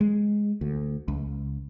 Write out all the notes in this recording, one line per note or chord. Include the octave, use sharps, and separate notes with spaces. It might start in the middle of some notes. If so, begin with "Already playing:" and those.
G#3
D2
C#2